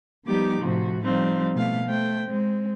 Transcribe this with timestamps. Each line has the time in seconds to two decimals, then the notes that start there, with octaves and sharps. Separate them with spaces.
0.24 F3 G3 B3 D#4 G4 D6
0.60 A2 C3 F3 F#4
1.03 F3 G3 C4 D#4 F5
1.53 B2 A3 F5
1.86 A3 C5 G5
2.26 G#3 C4